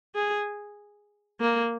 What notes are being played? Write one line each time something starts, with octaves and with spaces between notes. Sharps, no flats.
G#4
A#3